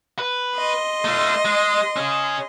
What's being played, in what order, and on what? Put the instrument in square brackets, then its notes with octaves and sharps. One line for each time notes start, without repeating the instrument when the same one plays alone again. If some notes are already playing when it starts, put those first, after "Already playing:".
[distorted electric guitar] B4
[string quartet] D#5 C6
[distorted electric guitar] A3 F4
G#3
C#4 G#4